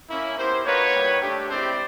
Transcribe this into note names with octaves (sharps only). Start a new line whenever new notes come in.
A#3 C#4 E4
B3 E4 G4 A#4 C5
A#3 D#4 F#4 B4 C#5
G3 A#3 D#4 G4
A3 D4 G4
G#3 C4 E4 G4 C5 D5